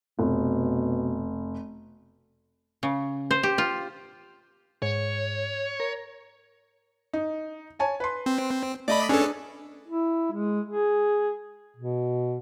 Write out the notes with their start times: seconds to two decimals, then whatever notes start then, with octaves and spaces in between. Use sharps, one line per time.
0.19 F1 B2
2.83 C#3
3.31 C5
3.43 G4
3.58 F4
4.82 G#2 C#5
5.80 A#4
7.13 D#4
7.79 C#5 G#5 A5
8.00 B4 C6
8.26 C4
8.88 A3 D5 D#5 B5
9.09 C#4 D4 G#4 A4 B4
9.88 E4
10.32 G#3
10.66 G#4
11.77 B2